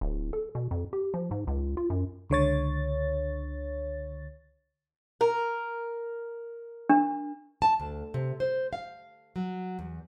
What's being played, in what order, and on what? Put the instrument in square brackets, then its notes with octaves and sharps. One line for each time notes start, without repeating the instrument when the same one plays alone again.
[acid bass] D1
A4
B2
F2
G4
F3
G#2
C#2
F4
F#2
[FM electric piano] C#2 D3 C#5 A6
[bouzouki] A#4
[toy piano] D4
[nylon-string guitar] A5
D2
C3
C5
F5
F#3
E2